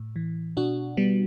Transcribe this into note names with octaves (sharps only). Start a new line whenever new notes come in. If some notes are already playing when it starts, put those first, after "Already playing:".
Already playing: A2
E3
B2 D4 F#4
G3 B3